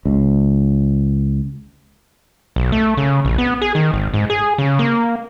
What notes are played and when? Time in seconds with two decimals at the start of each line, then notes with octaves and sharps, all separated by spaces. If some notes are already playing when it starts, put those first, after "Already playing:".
0.05 C#2
2.56 B1
2.72 A3
2.97 C#3
3.25 A#1
3.38 B3
3.62 G#4
3.75 D#3
3.94 G#1
4.14 G#2
4.30 G#4
4.58 C#3
4.79 A#3